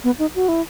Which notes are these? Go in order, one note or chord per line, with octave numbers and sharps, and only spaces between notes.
B3
D#4
F#4
E4